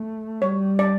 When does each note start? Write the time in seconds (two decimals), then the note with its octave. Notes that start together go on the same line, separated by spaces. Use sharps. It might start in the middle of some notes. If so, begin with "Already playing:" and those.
Already playing: A3
0.41 G3 C#5
0.79 D5